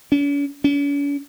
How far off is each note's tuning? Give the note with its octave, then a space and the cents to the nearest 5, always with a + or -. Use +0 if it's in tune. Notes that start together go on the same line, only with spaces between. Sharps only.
C#4 +45
C#4 +45